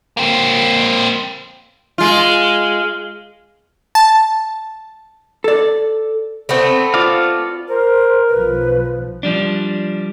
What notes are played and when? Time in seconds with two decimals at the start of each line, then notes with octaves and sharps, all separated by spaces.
0.17 A#3 C4
1.98 G#3 F4
3.95 A5
5.44 A4 D5
6.49 A3 B3 C4
6.94 F4 D5 F5
7.68 A#4 C5
8.29 B1 F3 B4
9.23 F3 G3 D4